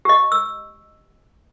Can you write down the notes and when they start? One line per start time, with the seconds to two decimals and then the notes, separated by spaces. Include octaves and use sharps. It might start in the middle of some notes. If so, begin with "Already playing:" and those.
0.05 G4 D#5
0.32 E6